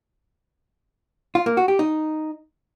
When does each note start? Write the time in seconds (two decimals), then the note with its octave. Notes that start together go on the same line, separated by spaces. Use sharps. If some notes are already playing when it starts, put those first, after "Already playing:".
1.35 F4
1.46 A#3
1.57 F#4
1.68 G4
1.79 D#4